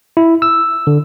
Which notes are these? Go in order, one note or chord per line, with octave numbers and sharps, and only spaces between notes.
E4
E6
D3